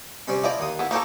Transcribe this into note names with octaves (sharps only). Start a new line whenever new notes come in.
C3 G3 C#4
F3 E4 D5 D#5
D#2 D#6
B3 E4
A#3 D#4 G4 A4 A#4 C#5